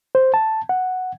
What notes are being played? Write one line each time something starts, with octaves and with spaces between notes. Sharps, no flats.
C5
A5
F#5